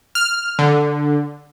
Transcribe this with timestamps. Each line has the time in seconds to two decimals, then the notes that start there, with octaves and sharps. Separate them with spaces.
0.15 F6
0.59 D3